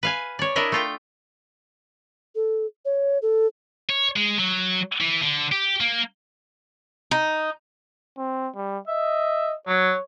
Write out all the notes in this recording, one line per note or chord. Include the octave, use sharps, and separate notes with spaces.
B4 F5 G#5
C#5 D5
D4 E4 A#4 D#5 E5
A3 F4 G5
A4
C#5
A4
C#5
G#3
F#3
E3
D3
G4
A#3
D#4
C4
G3
D#5 E5
F#3 C#5